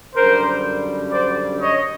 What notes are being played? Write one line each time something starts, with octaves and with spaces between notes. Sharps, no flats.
F#2 D3 G3 A#4 C5
C5 D5
C#5 D#5